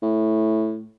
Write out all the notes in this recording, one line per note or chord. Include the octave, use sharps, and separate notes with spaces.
A2